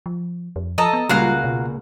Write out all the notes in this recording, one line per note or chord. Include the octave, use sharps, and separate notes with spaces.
F3
F2
F3 A4 D#5 A#5
B3
C#2 A#2 G3 F#4 F5 A#5
B2